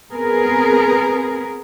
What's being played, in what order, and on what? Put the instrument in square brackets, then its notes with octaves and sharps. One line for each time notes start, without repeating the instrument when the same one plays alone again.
[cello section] B3 C4 G#4 A#4 B4